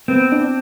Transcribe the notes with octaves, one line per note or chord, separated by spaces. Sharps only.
B3 C4
D4